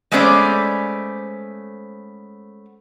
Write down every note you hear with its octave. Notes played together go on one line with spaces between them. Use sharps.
G#3 A3 B3 C#4 C5 D5